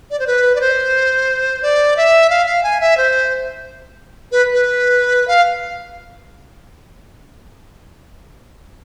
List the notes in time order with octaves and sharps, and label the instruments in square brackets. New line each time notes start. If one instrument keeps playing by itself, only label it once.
[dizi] D5
C5
B4
D5
C5
D5
E5
F5
F5
G#5
E5
C5
B4
B4
F5